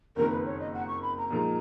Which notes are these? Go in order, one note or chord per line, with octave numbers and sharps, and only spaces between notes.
F#1 F2 D#3 A#3 A#4
B4
C#5
D#5
F#5
C#6
B5
A#5
A#2 F3 G#3 D#4 A#4